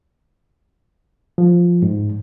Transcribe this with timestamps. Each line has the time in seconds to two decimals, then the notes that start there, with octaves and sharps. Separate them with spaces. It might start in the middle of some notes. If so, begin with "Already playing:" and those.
1.38 F3
1.82 G#2